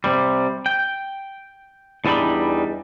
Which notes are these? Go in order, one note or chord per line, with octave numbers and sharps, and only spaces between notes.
C3 G3
G5
E2 E3 G3 D4 D#4 B5